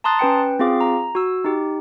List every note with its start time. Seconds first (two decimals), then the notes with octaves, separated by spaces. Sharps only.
0.04 A5 A#5 C6 D#6 F#6 A6
0.19 C#4 B4 G5 C#7
0.59 C4 F4 G#4 F5 D6
0.80 A#5
1.15 F#4 E6
1.44 D#4 G4